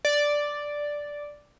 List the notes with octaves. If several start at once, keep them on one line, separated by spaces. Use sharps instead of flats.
D5